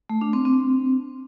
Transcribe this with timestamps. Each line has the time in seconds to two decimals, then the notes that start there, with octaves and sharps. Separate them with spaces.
0.10 A3
0.21 D4
0.33 C4
0.45 C4